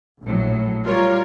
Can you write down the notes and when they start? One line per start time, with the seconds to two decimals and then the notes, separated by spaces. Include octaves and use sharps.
0.23 A#1 A2 F#3
0.85 G3 F4 A#4 C#5